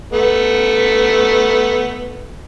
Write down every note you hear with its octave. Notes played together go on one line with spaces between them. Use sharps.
A3 B3